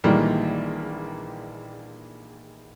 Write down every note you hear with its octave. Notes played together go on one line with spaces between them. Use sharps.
A#1 D#3 E3 G3 G#3 A#3